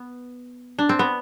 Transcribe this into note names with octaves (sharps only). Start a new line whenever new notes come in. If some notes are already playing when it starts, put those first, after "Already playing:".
Already playing: B3
D4
C4
B3